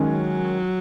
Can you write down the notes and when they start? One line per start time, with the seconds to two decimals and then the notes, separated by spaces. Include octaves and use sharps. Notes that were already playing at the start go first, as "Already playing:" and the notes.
Already playing: D#3 F#3 G#3 C#4